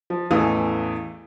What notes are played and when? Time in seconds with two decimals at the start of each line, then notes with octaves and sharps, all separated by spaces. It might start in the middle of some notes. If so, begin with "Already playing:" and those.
0.10 F3
0.31 A1 E2 E3 A3 F5 D#6